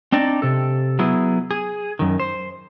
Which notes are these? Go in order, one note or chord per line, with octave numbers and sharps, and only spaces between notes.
C4 D4 D#4 D5
C3 A4
F#3 B3 E4 G#4
G#4
F#2 D#3
C5